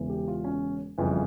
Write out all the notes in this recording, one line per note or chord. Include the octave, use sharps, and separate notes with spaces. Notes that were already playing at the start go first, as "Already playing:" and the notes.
Already playing: E1 E2 C#3 E3
G4
F4
C#4
G1 F2 C#3 E3